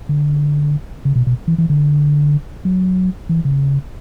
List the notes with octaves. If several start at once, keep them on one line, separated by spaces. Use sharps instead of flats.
D3
C#3
B2
B2
E3
E3
D3
F#3
E3
C#3